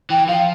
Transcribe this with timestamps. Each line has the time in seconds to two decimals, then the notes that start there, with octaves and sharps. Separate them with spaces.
0.10 E3 G5
0.28 F3 F5